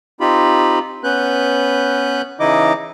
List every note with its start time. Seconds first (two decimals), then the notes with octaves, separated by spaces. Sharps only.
0.20 C4 D#4 F4 G4 B5
1.04 B3 C#4 B4 F#6 G6
2.40 C#3 E3 D#4 E4 D#5 D6